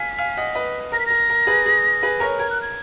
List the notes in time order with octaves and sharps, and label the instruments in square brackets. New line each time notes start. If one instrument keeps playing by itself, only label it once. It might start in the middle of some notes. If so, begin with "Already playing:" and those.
Already playing: [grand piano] F5 G#5 [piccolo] B6
[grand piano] F5 G#5
D#5 F#5
B4 D#5
[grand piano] A#4 [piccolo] A#6
[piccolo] B6
[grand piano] A#4 [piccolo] A#6
[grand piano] A#4
G#4 B4
G#4
G#4 B4
A#4 C#5
[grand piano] A#4 [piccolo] G#6
[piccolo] F#6
G#6